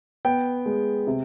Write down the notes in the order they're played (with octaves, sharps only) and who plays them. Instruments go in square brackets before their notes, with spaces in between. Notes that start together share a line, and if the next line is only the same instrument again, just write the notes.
[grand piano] B3 G5
G#3
C3